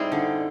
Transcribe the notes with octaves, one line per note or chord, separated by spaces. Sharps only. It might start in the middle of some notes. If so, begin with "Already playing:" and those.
Already playing: G3 C4 D#4 E4 G#4
D3